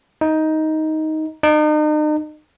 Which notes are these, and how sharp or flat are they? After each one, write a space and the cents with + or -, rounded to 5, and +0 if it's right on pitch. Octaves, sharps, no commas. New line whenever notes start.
D#4 +10
D#4 -40